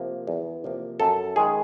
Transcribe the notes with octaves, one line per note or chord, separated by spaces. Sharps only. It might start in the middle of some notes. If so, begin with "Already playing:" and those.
Already playing: C3 F3 A#3
E2
C3 F3 A#3
F#2 A4
D#3 G#3 G#4